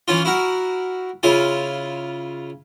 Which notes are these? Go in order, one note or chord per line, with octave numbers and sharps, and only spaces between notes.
E3 C#4 F4
E4 F#4 A#4
C#3 E4 F4 G#5